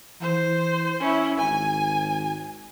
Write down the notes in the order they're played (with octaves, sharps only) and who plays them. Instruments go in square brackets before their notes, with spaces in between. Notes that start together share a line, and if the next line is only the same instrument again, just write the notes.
[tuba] E3 [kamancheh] C5
[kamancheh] C#4 E4
[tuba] G#1 [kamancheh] G#5